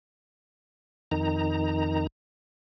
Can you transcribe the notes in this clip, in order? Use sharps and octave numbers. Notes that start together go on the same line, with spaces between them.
F2 D#3 D#4 A#5